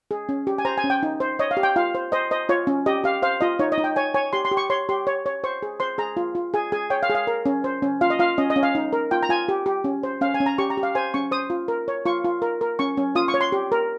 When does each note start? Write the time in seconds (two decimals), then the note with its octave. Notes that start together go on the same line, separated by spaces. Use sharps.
0.11 G#4
0.29 C#4
0.47 G4
0.58 G#5
0.65 C5 A#5
0.78 G#5
0.84 C#4
0.90 G5
1.03 D#4
1.20 C5
1.39 C#5 D#5
1.51 F5
1.57 G4
1.63 G5
1.76 F4 F5
1.95 C5
2.12 C5 D#5
2.31 C5 D#5
2.49 F4 C#5
2.67 C#4
2.86 G4 D#5
3.04 G4 F5
3.22 C5 F5
3.41 F4 D#5
3.59 D#4 C#5
3.72 D#5
3.78 D#4
3.84 G5
3.96 C#5 G#5
4.14 C#5 G#5
4.33 G4 C6
4.45 C6
4.51 G4
4.57 C#6
4.70 C#5 C6
4.89 G4 C6
5.07 C#5
5.26 C#5
5.44 C5 C#6
5.62 G#4
5.80 C5 C6
5.98 G#4 A#5
6.17 F4
6.35 F4
6.54 G#4 G#5
6.72 G#4 G#5
6.90 C#5 G5
7.03 F5
7.10 G#4
7.15 F5
7.27 A#4
7.46 C#4
7.64 C5
7.82 C#4
8.01 F4 F5
8.10 D#5
8.19 F4 F5
8.38 C#4 D#5
8.50 D#5
8.56 C#4
8.63 F5
8.75 D#4
8.93 A#4
9.11 F4 G5
9.23 A#5
9.29 F4 G#5
9.49 G4
9.66 G4
9.84 C#4
10.03 C5
10.21 C#4 F5
10.34 G#5
10.40 C#4
10.46 A#5
10.58 G4 C#6
10.70 A#5
10.77 G4
10.83 F5
10.95 C5 G#5
11.14 C#4 C#6
11.31 C5 D#6
11.50 F4
11.68 A#4
11.88 C#5
12.06 F4 C#6
12.24 F4
12.42 A#4
12.61 A#4
12.79 C#4 C#6
12.97 C#4
13.15 F4 D#6
13.28 C#6
13.34 C#5
13.41 C6
13.52 G4
13.72 A#4